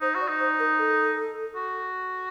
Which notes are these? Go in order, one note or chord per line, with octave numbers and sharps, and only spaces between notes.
D#4 C5
F#4
D5
D#4
C5
A#4
A4
F#4